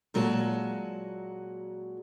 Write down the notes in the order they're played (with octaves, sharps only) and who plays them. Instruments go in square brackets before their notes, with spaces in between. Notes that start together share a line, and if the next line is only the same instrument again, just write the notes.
[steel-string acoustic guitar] A#2 F#3 G#3 F#4 D5 A5